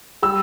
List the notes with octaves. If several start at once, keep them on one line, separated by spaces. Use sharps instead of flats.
G3 E6